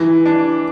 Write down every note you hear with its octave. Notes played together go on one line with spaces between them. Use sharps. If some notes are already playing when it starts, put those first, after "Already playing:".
Already playing: E3
D4